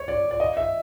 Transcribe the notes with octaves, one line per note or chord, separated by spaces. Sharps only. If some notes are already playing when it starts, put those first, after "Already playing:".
Already playing: C#5
D5
D5
D#5
E5